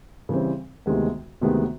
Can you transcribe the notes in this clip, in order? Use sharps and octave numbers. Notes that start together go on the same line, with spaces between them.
C#3 E3 G3 C4
D2 C3 D#3 G#3 B3
D2 C3 D#3 G#3 B3